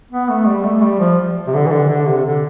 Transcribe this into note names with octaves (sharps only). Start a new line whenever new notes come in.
B3
A3
G3
A3
G3
F3
C3
D3
E3
D3
D3
C3
D3